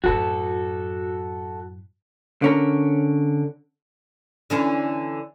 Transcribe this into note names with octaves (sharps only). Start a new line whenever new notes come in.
F#2 A2 F#4 A4
D3 C#4 A#4
D3 E3 C#4